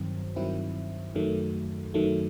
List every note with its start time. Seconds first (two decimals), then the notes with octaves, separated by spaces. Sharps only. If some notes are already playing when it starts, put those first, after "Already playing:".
Already playing: G2 D#3 F#3 C4
0.36 G2 D#3 F#3 C4 E4
1.15 F#2 D#3 F#3 A3
1.94 F#2 D#3 F#3 A3